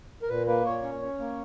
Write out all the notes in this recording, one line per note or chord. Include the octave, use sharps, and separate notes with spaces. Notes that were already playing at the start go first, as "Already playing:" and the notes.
A#4
A#2 B4
A#3 B4
A#2 C#5
C#4
C#4
A#3